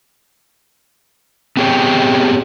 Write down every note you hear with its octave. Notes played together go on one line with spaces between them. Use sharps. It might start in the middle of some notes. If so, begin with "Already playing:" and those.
B3 C4 G4 G#4 C#5 G5